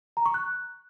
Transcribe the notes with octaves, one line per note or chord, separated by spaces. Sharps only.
A#5
C#6
F#6